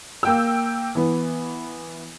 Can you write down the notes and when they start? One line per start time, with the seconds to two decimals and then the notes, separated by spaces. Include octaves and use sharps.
0.23 A#3 G5 E6
0.95 E3 B3